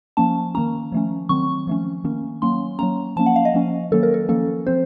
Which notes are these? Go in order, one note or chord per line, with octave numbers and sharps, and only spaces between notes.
F3 A#3 C#4 A5
D#3 A#3 C#4 A#5
F3 A3 C#4
D#3 F#3 C4 C#6
F3 A3 C#4
D#3 A#3 C#4
F#3 A#3 C#4 C6
F#3 A#3 C#4 A#5
F3 A#3 C#4 A5
F#5
F5
D#5
F3 A#3 C#4
D#3 F#3 A#3 C#4 A4
A#4
A4
F3 A#3 C#4 A4
F3 C4 C5